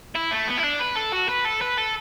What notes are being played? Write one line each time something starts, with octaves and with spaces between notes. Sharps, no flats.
E4
A3
B3
E4
D4
B4
A4
F#4
B4
A4
B4
A4